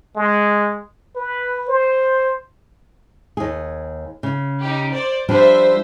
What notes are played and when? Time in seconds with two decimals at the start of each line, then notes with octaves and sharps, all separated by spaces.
0.16 G#3
1.16 B4
1.69 C5
3.37 D#2 G#4
4.23 C#3
4.59 D#4 G4
4.92 C5 D5
5.29 F3 G3 D4 C5 E5